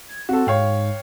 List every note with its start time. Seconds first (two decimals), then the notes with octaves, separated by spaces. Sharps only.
0.08 G#6
0.29 C4 F#4 A4
0.47 G#2 C#5 F5 G5